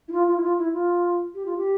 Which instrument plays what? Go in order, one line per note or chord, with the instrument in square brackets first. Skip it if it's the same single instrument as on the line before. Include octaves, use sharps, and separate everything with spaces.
[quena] E4
F4
F4
E4
F4
E4
F4
G4
F4
G4